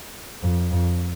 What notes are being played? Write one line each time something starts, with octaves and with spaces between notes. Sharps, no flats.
F2
F2